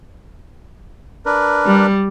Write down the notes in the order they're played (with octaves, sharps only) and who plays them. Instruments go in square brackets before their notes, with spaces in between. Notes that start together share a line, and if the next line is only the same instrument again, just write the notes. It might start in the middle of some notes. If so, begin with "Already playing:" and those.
[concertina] D4 A#4 B4
[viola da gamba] G3